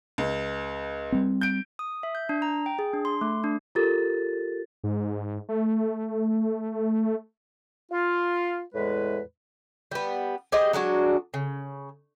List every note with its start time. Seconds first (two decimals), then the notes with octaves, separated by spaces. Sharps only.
0.18 C#2
1.12 G3 C4
1.41 G6 D7
1.79 D#6
2.03 E5
2.15 G6
2.29 D4
2.42 A#5
2.66 G5
2.79 G#4
2.93 D4
3.05 C6
3.21 A3
3.44 D4
3.75 F4 G4 A4 A#4 A6
4.84 G#2
5.49 A3
7.91 F4
8.74 E2 A2 G#3 B4
9.91 G3 B3
10.52 G4 G#4 C5 D#5
10.73 F#3 G#3 D4 F#4
11.34 C#3